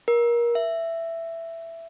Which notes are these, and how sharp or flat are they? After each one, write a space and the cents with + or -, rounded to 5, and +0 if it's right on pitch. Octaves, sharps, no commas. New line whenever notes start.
A#4 +25
E5 +10